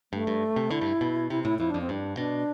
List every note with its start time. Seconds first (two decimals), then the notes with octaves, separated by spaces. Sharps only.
0.12 G2 A3
0.27 G2
0.56 C3
0.70 D3 E4
0.81 G2
1.01 B2
1.30 C3 E4
1.44 A2 E4
1.59 F2 E4
1.70 F2 D4
1.81 C4
1.89 G2 D4
2.17 B2 D4